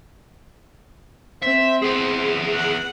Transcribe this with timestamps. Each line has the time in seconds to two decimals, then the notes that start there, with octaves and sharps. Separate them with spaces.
1.43 C4 E5
1.82 B3 G#4
2.53 F#5